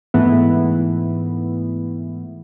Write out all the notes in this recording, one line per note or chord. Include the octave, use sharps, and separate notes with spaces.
G#2 E3 A3 B3 E4